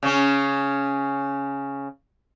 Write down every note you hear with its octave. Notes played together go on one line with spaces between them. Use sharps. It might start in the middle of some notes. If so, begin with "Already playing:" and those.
C#3 C#4